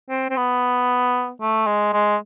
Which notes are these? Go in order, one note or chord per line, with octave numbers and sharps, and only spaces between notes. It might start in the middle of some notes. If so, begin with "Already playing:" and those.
C4
C4
B3
A3
G#3
G#3